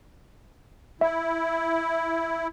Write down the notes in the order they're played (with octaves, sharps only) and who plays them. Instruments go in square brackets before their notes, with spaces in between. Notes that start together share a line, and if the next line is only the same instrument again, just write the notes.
[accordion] E4 [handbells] E5